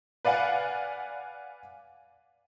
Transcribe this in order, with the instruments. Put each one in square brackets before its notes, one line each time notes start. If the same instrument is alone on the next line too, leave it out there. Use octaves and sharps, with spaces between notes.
[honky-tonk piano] B4 D5 F5 F#5 G#5